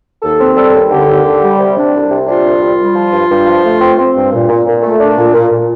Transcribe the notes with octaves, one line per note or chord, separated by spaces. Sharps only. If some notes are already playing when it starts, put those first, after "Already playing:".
D#2 A4
C4
G3 A4
D#2
D3 G4
D#2
D3
G3
C3
D4
C2
C3
D4 F4
C2
G3
G3
F3
G2
G2
F3
A3
C4
C4
G2
A#2
A#2
A#2
A3
D4
A#2
A#2
A#2